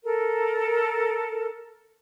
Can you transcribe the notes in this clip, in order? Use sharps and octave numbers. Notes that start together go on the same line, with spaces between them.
A4 A#4